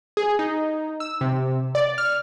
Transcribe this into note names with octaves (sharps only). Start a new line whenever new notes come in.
G#4
D#4
E6
C3
D5
F6